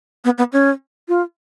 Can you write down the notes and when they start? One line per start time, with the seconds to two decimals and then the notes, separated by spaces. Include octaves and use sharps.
0.25 B3
0.38 B3
0.53 C#4
1.08 F4